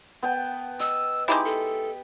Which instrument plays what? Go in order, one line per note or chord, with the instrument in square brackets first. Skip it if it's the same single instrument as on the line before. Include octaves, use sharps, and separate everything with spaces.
[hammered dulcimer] B3 G5 A5
[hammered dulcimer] D#5 [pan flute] E6
[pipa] G#3 D#4 E4 [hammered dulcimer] G4 [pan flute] D6
[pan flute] A4